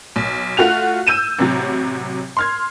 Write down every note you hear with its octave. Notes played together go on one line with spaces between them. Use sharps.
B1
A3 F4 F#4 F#6 F7
E6 G6 D#7 E7
A1 C3 F#3
C6 F6 G#6